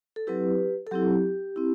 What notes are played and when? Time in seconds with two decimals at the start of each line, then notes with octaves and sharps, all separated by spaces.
0.16 A4
0.27 F#3 C4 E4 G4 B4
0.87 A4
0.91 F#3 C4 E4 G4
1.56 C4 E4